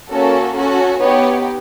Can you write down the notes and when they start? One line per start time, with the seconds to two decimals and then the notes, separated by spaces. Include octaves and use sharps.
0.10 A#3 C#4 F#4 A4
0.55 C#4 F#4 A4
0.99 B3 D#4 G4 C#5